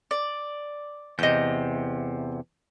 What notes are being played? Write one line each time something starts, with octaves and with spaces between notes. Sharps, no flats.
D5
E2 C3 D#5 G6